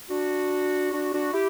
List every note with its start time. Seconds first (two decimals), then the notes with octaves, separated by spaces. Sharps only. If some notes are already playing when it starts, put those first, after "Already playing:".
0.10 D4 F#4
0.92 D4 F#4
1.14 D4 F#4
1.33 E4 G4